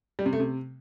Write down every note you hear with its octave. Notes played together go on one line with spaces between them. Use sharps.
G3
C3
A3
C3